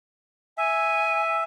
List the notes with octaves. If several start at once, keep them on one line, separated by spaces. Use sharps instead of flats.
E5 G#5